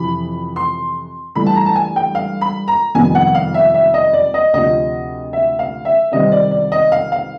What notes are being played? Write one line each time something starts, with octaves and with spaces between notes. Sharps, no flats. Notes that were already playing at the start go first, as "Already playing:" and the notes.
Already playing: F2 C3 E3 B5
C6
G2 E3 A3 B5
A5
A#5
A5
G#5
G5
F5
B5
A#5
F2 C3 D#3 G3 B3 G#5
F#5
F5
E5
E5
D#5
D5
D#5
D2 C3 F3 D#5
E5
F5
E5
C2 C3 D#3 G3 C4 D#5
D5
D5
D#5
F5
F5